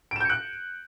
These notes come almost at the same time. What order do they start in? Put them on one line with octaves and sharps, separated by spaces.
D7 E7 G6 C#7 F#6